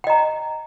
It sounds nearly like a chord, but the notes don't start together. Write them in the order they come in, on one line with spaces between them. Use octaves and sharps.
G5 D#5 A#5